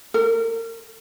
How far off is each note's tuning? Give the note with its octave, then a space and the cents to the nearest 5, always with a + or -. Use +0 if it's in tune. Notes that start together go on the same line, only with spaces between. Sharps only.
A#4 -35